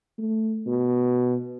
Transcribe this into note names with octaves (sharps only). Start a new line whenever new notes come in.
A3
B2